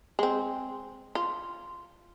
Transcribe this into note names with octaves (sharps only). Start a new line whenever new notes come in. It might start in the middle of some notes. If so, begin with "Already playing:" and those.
G#3 C4
F4